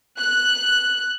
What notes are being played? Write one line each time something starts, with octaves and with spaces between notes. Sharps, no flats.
F#6